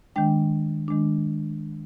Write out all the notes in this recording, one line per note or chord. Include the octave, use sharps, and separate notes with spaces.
D#3 G#3 D4 G5
D#3 G#3 D4